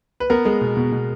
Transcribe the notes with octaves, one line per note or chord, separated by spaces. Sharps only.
B4
B3 A#4
G#3
B2
B2
B2